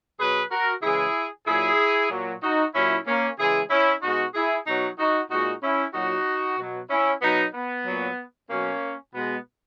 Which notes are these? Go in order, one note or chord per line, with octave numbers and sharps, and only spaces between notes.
B2 F#3 G#4 B4
F#4 A#4
C#3 E3 G#3 E4 G#4
A#2 F#3 E4 G#4
A#2 F#3
D#4 F#4
A#2 F#3 C#4 E4
A#3 C#4
C#3 E3 G#3 E4 G#4
C#4 E4
B2 G#3 D#4 F#4
E4 G#4
B2 F#3 D#4 F#4
D#4 F#4
A#2 G#3 D#4 F#4
C#4 E4
A#2 F#3 D#4 F#4
B2 F#3
C#4 E4
B2 F#3 B3 D#4
B3
A#2 F#3
B2 F#3 A#3 C#4
B2 G#3 B3